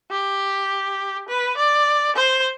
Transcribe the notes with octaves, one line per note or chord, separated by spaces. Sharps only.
G4
B4
D5
C5